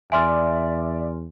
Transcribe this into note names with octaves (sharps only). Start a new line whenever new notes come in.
E2 D5 E5 G#5 C6 F6